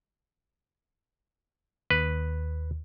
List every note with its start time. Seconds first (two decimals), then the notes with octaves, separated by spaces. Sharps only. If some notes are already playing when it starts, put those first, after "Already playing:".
1.90 D#2 B4